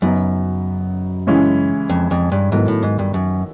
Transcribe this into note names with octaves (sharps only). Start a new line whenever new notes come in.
F#2 C#3 F#3 B3 D#4
C#3 E3 G#3 C#4 E4
F2
F2
G2
G#2 D#3 F#3 B3 E4 A4
A2
G#2
G2
F#2